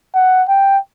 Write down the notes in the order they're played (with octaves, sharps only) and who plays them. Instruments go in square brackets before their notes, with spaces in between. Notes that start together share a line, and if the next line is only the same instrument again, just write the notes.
[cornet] F#5
G5